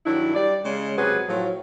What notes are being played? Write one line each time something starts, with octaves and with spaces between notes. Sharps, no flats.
G2 D#3 F#3 D4 E4
G3 D5
C#3 G#3
F2 C3 F#3 F#4 G#4 B4
A2 F3 F#3